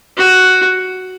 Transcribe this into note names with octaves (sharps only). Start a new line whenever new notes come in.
F#4